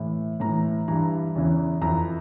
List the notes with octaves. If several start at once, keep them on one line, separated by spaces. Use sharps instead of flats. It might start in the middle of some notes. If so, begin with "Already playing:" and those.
Already playing: A2 E3
A2 E3 A#5
G2 E3 A#5
E2 C#3 E3
F2 E3 A#5